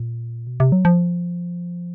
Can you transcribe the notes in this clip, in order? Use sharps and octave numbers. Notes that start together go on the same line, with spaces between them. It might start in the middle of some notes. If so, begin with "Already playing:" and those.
Already playing: A#2
B2
C3
F#3
F3